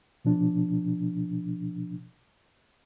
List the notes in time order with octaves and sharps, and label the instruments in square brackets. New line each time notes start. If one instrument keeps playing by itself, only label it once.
[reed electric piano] B2 F3 D4